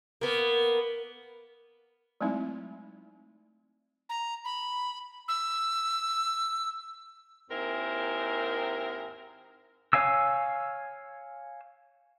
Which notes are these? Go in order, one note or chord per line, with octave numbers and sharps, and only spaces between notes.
A#3 B3
F#3 G#3 A3 C4 D#4 E4
A#5
B5
E6
D#2 G#2 C4 E4 A#4
C#5 F5 G#5 E6